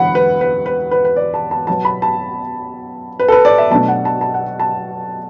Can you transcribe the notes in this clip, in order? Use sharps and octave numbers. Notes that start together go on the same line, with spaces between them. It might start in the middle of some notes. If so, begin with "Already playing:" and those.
Already playing: E1 E2 D3 F#3 F#5 B5
B4
B4
B4
B4
B4
D5
A5
A5
B1 B2 F#3 B3 A5
B5
A5
B4
A4
B4
D5
E5
B1 B2 F#3 A3 D4 A5
F#5
A5
A5
F#5
A5